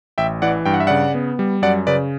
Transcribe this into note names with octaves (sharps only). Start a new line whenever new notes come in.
A1 E5 G5
E3 D5 F#5
G2 G5
F#5
E5
C#3 D5 F#5
B3
G3
F#2 D5 F#5
C#3 B4 D5